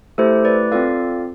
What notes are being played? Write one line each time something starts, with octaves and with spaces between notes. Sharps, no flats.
A3 E4 G4 A4 C5
B4 D5
C4 F4 A4 D5 F5